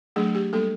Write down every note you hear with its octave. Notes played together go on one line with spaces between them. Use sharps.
F#3 A3 D4 G#4
G4
G3 A#3 D4 A4